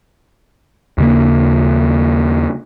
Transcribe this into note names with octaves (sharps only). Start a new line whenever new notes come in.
D#2 C#3 A#3